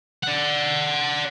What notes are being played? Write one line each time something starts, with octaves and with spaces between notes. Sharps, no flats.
D5 F#5